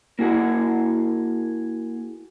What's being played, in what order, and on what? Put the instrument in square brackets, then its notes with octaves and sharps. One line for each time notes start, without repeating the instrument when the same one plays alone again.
[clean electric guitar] A#3 E4 F#4 G#4 F#5